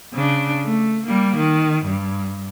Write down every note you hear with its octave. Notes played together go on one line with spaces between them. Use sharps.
C#3 D4
A3
G3 A#3
D#3
G2